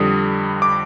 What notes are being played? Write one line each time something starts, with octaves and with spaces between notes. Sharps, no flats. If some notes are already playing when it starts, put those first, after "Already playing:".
Already playing: F2 D3 G3 D#6
D6